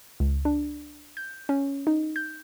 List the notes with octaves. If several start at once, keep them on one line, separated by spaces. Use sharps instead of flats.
C#2
D4
G6
C#4
D#4
G6